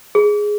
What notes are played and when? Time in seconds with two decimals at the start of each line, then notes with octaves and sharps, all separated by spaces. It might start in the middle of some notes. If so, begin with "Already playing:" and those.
0.15 G#4